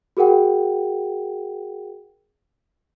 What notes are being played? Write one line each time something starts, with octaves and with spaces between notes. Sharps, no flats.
F#4 G#4 A#4 F#5 G5